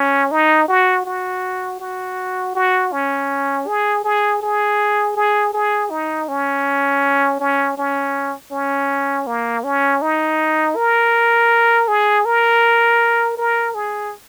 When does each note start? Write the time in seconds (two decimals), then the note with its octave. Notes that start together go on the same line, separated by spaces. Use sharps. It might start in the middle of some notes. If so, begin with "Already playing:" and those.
Already playing: C#4
0.31 D#4
0.68 F#4
1.06 F#4
1.80 F#4
2.55 F#4
2.92 C#4
3.67 G#4
4.04 G#4
4.42 G#4
5.16 G#4
5.54 G#4
5.90 D#4
6.28 C#4
7.40 C#4
7.77 C#4
8.52 C#4
9.27 A#3
9.64 C#4
10.02 D#4
10.76 A#4
11.88 G#4
12.25 A#4
13.37 A#4
13.75 G#4